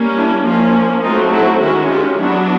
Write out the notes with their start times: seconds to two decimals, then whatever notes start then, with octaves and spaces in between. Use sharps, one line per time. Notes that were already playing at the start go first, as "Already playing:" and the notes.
Already playing: G3 A#3 C#4
0.16 D4 E4
0.45 F3 A#3 C#4 D#4 F4
1.03 F#3 A3 C4 D#4 F4
1.33 E4 F#4
1.61 D#3 G#3 C#4 E4 F#4
1.90 F4 G4
2.18 F#3 B3 D4 E4 F#4